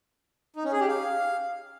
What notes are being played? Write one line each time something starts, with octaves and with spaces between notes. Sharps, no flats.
D#4
C#4
G#4
G4
F5